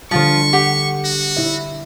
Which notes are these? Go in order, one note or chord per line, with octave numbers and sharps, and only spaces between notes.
D3 F3 G3 F4 C5 C#6
G4 F#5
F#4
E4 E5